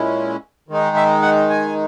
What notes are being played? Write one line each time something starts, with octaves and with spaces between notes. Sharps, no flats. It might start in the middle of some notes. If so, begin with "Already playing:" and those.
Already playing: A#2 G#3 C#4 E4
D#3 G#3 D#4
E5
F#5
G#5